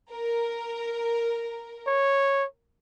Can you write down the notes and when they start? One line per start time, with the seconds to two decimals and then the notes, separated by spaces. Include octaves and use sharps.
0.12 A#4
1.87 C#5